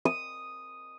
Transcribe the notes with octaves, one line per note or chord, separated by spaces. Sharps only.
D#6